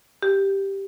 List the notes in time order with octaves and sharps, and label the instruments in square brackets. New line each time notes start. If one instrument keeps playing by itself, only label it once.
[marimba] G4